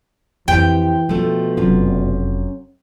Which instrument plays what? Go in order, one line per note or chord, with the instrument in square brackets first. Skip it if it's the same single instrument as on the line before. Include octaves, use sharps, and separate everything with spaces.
[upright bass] F2 [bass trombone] E3 [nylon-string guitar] G4 B4 C5 [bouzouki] G5
[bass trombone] B2 [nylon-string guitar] F3 A3 [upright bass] D4
[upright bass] F1 [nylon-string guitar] F#2 F4